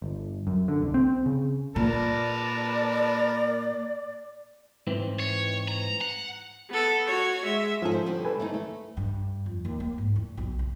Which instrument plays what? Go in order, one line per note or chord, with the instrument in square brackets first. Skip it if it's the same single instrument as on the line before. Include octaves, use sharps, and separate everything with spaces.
[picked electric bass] G1
F#2
D3
C2
C4
C#3
[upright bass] A#2 [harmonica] A#4 B4 A5 [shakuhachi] D5
[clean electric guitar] G#2 E3 C4
[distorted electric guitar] C#5
A#5
F#5
[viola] B3 A4
F#4 C#5
G#3 E5
[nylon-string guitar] G#2 C#4 G#4 [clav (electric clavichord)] F3 A4
[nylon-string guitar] C5
A2 D3 G3
[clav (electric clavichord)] A4 B4 G#5
[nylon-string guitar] E3 A3 D#4
A3
[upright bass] G2
F2
D#2
A#3
G#2
E2
B1
C#3